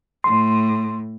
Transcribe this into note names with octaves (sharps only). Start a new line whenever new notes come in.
A2 C6